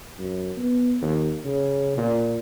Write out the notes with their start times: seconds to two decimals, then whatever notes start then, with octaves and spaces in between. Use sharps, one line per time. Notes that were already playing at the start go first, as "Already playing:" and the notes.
0.19 F#2
0.57 B3
1.02 D#2
1.45 C#3
1.97 A#2